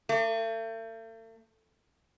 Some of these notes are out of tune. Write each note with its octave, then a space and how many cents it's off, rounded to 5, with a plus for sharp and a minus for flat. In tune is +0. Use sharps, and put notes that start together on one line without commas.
A3 +40